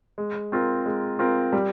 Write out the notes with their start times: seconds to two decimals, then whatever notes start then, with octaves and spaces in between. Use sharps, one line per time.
0.18 G#3
0.52 C4 F4 A#4
0.86 G#3
1.19 C4 F4 A#4
1.53 G3